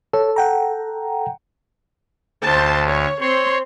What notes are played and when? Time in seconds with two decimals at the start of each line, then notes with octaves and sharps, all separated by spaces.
0.13 A4 C#5
0.36 F#5 G5 A#5
2.44 D2 C5 A5
2.87 C#5
3.20 C4 C#5 C6